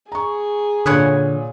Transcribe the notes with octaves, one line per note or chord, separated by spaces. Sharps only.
G#4 A#5 C#6
A#2 D3 B4 C#5 F#5 G#5 D#6